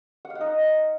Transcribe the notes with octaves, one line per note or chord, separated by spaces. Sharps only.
F#5
F5
F#5
D#4